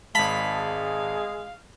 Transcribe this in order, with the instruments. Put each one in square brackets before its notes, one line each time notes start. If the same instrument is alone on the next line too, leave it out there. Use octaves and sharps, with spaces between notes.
[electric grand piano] G#1 A5 [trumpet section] G#3 G#4 [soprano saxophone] F5 [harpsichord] B5